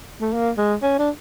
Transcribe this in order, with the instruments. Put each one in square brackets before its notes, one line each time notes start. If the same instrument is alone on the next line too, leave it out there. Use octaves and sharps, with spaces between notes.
[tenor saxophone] A3
A#3
G#3
C#4
D4